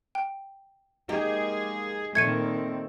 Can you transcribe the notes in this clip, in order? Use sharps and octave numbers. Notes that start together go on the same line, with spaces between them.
G5
G#3 A#3 D#4 G4 G#4 A#4
A#2 D#3 A3 C4 G#6 C#7 D#7